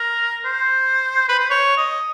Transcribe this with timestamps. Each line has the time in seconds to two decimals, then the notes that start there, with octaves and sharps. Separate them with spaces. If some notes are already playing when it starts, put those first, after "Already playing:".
Already playing: A#4
0.45 C5
1.29 B4
1.39 C5
1.50 C#5
1.77 D#5